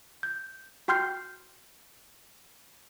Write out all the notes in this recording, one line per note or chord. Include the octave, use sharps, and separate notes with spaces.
G6
F#4 G5 C6 F6 G6 C7